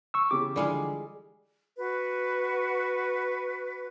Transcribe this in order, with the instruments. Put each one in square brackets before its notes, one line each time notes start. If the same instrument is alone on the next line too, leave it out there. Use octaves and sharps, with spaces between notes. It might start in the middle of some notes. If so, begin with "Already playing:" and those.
[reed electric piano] C#6 E6
[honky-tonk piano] C#3 E3 G4 [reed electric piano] D6
[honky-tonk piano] D3 E3 F3 [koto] G3 G#3 F5
[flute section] F#4 B4